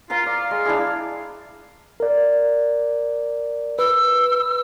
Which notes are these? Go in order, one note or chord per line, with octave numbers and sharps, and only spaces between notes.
F4 A#4 F5 A#5
D5 F5
G#3
D4 E4 G#4
A#4 D5
B4 E6